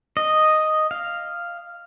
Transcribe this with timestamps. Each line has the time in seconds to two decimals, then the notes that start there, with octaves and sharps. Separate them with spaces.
0.17 D#5
0.91 F5